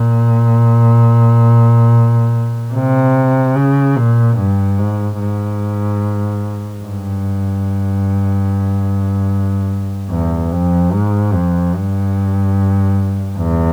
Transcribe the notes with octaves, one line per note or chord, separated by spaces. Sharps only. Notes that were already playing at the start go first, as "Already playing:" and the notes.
Already playing: A#2
C3
C#3
A#2
G2
G#2
G#2
G2
E2
F2
G#2
F2
G2
E2